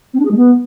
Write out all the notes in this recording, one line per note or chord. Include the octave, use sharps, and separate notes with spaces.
C4
D4
G#4
G#3
B3